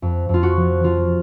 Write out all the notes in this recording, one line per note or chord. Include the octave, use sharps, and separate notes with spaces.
F2
F2 F4
F#4
F3
F3 F4